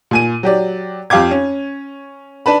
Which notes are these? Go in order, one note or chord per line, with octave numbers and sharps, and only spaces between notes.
A#2 G#5 D#7
F#3 G4 D5
F2 G4 F5 G5 D6 G#6
C#4
D4 B4 A5 B5